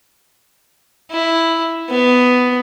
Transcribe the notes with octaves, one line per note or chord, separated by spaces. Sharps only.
E4
B3